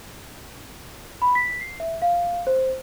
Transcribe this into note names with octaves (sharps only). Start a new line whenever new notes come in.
B5
B6
C7
E5
F5
C5